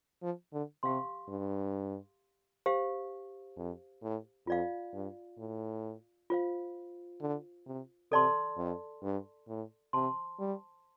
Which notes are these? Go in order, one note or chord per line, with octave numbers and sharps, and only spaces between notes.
F3
D3
C3 G4 F5 C6
G2
G4 C5 F5
F2
A2
F2 F4 D5 F5
G2
A2
F4 C5 F5
D3
C3
C3 A4 D5 A5 C6
F2
G2
A2
C3 C5 A5 C6
G3